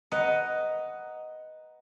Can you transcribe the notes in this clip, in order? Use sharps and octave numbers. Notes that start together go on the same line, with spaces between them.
B4 D#5 F#5 A#5